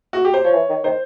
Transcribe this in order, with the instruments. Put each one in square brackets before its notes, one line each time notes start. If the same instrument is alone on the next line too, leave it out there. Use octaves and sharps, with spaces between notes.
[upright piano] F#4
G4
C5
[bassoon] F3 [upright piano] C#5
[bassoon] E3
D#3
[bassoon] D#3 [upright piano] C5